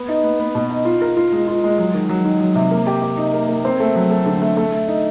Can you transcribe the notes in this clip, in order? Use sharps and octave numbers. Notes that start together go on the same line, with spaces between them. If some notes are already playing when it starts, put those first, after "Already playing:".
Already playing: B3
D#4
B3
B3
B2
D#4
F4
A#4
F4
G#3
F4
G#3
F#3
D#3
F#3
D#3
F#3
C3
A#3
G4
G4
D#4
A#3
A#3
C4
A3
F#3
A3
D3
A3
A3
A3
D#4